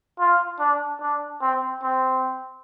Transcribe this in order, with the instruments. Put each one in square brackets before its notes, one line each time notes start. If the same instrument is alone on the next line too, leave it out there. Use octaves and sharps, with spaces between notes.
[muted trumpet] F4
D4
D4
C4
C4